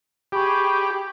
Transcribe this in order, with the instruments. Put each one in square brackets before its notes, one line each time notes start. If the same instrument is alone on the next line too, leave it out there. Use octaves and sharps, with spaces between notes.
[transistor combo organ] G4 [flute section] G#4 B5 C#6